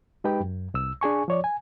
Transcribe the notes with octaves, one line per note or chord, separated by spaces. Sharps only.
G#3 D#4 G4 B4 G5
F#2
C2 E6
D4 G#4 G#5 C#6
F3 C#5 D5
G#5